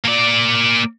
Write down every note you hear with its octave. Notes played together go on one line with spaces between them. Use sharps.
A#3 D5